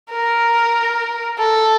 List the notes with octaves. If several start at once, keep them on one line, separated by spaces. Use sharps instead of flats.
A#4
A4